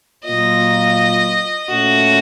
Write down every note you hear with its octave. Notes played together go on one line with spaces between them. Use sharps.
A#2 F#3 A#3 F4 D#5
A#2 A3 C#4 F#4